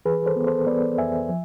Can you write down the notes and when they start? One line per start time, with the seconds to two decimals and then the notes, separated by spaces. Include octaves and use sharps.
0.05 E3 G#4 B4
0.26 A4 C5
0.36 B3
0.47 A4 C5
0.67 B3 B4 D5
0.98 F2 E5 G#5
1.29 F3